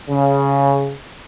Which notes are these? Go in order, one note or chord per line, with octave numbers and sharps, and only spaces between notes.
C#3